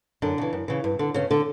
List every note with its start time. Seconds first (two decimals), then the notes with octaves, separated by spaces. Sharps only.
0.22 F#2 D3 D4
0.38 C#3 E3
0.53 F#2
0.68 C#3 E3
0.84 G2
0.99 D3
1.14 G2 C#3 C#4
1.31 D3